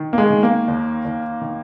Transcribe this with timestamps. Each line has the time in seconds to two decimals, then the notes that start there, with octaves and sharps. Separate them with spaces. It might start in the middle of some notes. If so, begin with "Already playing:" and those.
Already playing: D#3
0.13 A#3
0.18 G#3
0.30 D#3
0.43 A#3
0.68 D#2
1.05 D#2
1.42 D#3